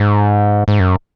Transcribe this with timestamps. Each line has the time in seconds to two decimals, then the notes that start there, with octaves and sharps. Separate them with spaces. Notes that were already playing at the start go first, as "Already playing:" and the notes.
Already playing: G#2
0.68 G#2
0.80 F#2